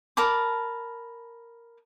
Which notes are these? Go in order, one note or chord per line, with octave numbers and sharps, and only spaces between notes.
A#4 A5 B5 D6